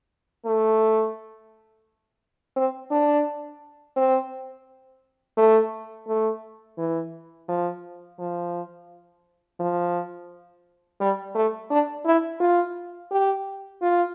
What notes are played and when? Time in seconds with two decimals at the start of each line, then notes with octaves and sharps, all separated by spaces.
0.45 A3
2.57 C4
2.91 D4
3.96 C4
5.37 A3
6.08 A3
6.78 E3
7.49 F3
8.19 F3
9.60 F3
11.00 G3
11.35 A3
11.70 D4
12.06 E4
12.40 F4
13.11 G4
13.82 F4